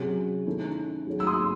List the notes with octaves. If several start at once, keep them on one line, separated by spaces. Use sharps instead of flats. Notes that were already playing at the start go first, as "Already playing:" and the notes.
Already playing: C3 F#3 C#4 G#4
D#3 A3 C#4 E4 A4
F#3 A3 D#4 G#4 C#5
E6
C6 D#6